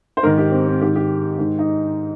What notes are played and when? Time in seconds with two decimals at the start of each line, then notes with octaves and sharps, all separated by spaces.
0.17 C5
0.23 G#2 D#3 A#4
0.38 G4
0.51 C4
0.67 C4
0.81 G#2 D#3 G4
0.96 G4
1.39 G#2 D#3
1.59 D#4